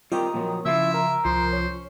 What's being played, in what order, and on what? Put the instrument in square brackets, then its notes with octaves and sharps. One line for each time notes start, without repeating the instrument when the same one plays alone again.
[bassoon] D#3 [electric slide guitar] G3 C4 G4 [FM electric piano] F4 A#4 D#6
[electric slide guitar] A#2 F3 F#3
[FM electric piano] C#3 [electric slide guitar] F3 F4 [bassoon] E4 [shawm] E5
[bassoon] A#4
[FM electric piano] C2 [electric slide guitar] F3 [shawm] C5
[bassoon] C#4